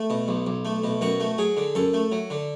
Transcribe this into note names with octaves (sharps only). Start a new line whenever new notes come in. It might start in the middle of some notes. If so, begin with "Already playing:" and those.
Already playing: A3
B2
B1
B1
A3
B2
F#2 F#4
A3
F#3 G#4
D3
F#2 A4
A3
F#3
D3